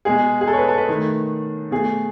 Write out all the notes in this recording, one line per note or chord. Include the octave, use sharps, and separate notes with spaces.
B2 G#3 G#4
G#4
A4
C#5
B4
A4
B4
D#3 A3
B2 A3 G#4